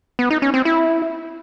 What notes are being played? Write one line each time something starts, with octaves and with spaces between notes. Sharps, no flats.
B3
D#4
C#4
C4
E4